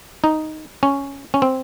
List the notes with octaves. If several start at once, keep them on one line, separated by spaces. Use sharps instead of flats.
D#4
C#4
C#4
C4